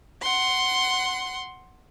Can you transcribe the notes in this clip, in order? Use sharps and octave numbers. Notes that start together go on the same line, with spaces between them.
F#5 C6